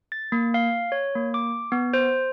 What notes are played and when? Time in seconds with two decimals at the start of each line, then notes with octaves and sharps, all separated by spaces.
0.12 A6
0.32 A#3
0.54 F5
0.92 C#5
1.15 A#3
1.34 D6
1.72 B3
1.93 C5